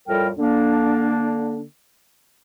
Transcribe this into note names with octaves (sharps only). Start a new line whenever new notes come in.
F2 A2 G3 F4 A#4 G5
D3 A#3 D4